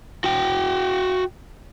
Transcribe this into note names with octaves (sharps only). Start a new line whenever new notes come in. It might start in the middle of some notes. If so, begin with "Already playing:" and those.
F#4 G5